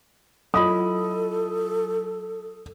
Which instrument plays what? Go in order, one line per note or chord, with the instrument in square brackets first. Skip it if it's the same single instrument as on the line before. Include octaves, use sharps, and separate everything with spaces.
[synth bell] F#3 F4 [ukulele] E4 D#5 B5 [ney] A4 [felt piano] D#6